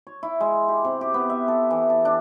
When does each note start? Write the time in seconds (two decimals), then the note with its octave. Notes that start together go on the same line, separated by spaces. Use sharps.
0.07 C#5
0.23 E4
0.41 G#3
0.68 G4
0.85 C3
1.01 G4
1.14 B3
1.30 E5
1.48 A4
1.71 E3
1.90 A5
2.05 D4